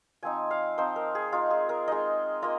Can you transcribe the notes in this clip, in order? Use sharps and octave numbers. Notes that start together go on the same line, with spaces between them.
F3 C4 D#4 G#5
F5
F3 C4 D#4 C5
A#4
G#4
G#3 D#4 F4
G#4
A#4
G#3 D#4 D#5
A#3 F4 D#5